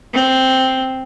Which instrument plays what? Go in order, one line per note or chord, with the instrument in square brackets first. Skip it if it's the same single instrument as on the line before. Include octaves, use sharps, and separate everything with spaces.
[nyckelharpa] C4